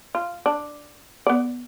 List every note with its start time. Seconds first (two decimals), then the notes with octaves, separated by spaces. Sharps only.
0.15 F4
0.46 D4
1.27 B3 D5